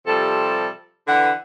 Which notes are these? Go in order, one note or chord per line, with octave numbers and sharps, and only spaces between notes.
C3 F3 G3 A4
D3 E3 B4 F#5